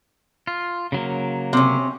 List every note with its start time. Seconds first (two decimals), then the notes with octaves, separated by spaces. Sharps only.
0.47 F4
0.92 C#3 F#3 A#3
1.53 C3 C#4